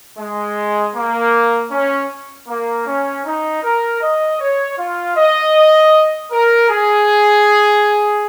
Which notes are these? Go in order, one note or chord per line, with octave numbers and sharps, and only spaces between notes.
G#3
A#3
C#4
A#3
C#4
D#4
A#4
D#5
C#5
F4
D#5
A#4
G#4